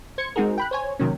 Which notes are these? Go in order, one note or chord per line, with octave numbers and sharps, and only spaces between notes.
C5 G#6 C#7
G#3 C4 D#4 F#4 G#4 A#4
G5 B5 F#6
C5 C#5 G#5
C3 D#3 F#3 A#3 C#4